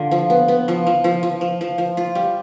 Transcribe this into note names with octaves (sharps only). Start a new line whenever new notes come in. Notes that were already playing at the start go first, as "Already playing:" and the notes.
Already playing: D3 F4
F3
B3
B3
F3
F3
F3
F3
F3
F3
F3
F4
G3